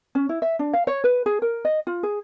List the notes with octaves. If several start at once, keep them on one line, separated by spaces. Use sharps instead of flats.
C#4
E4
E5
D4
F5
C#5
B4
G#4
A#4
D#5
F4
G#4